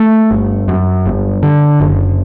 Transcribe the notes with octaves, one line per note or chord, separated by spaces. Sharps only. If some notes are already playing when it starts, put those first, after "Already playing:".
Already playing: A3
G1
F#2
G1
D3
F#1